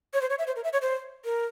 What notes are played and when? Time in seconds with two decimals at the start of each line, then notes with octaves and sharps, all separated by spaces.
0.13 C#5
0.21 C5
0.30 C#5
0.39 E5
0.47 C5
0.56 A#4
0.64 E5
0.73 C#5
0.82 C5
1.25 A#4